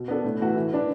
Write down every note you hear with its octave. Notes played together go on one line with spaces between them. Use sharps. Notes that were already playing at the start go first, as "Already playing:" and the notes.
Already playing: B2
B3 D4 A4
A2
E3 A3 F#4 B4
E3
D4 B4